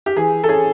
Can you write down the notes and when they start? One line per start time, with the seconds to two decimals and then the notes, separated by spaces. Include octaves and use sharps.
0.06 G4
0.16 E3 G#4
0.44 A4
0.49 C#4 G#4